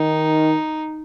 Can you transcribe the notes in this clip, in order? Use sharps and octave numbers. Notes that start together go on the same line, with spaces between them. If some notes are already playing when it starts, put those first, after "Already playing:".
Already playing: D#3 D#4